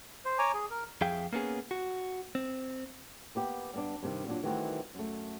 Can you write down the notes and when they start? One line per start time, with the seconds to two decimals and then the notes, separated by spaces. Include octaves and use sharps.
0.25 C5
0.38 C#5 G#5 A#5 D6
0.54 G#4
0.70 A#4
1.01 F2 G#4 E5 F5 G5
1.33 A#3 B3 C#4 G#4
1.71 F#4
2.35 C4
3.35 A#3 B3 G4
3.74 G2 B3 D4
4.03 G2 C3 D#3
4.27 A#2 F#3 D4
4.43 D#3 E3 G3 A3 C4 F#4
4.95 F#2 A3